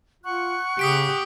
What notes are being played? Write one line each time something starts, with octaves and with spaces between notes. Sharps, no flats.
F4 F#5 C#6 F#6
C#3 G4 D#6 B6 D7